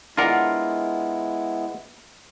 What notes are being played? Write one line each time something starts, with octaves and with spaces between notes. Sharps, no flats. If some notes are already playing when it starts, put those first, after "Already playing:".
G#3 B3 D4 E4 F4 A#4 F#5